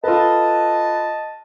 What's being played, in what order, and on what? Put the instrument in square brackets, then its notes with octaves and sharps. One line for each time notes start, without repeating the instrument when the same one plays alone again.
[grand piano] F4 A4 B4 [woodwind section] D#5 A5